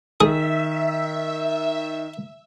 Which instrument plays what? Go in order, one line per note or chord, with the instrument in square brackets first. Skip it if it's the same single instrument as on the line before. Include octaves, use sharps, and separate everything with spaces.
[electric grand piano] D#3 [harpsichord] G#4 [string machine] E5